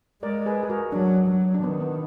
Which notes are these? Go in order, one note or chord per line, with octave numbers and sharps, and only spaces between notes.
G#3 A#4 D5
G#4 B4
G#4
F#4 A#4
F#3 D4
F#3
D4
D#3 B3
B3